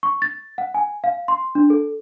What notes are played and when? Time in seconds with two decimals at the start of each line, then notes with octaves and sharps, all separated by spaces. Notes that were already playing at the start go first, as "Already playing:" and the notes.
0.03 C#6
0.22 A6
0.58 F#5
0.74 G#5
1.04 F5
1.28 C6
1.55 D4
1.70 A4